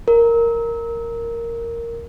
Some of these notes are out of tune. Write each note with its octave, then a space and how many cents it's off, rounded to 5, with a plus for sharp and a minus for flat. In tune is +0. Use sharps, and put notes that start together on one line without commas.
A#4 -5